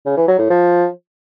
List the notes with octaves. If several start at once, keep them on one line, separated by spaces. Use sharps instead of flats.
C#3
E3
F#3
A2
F3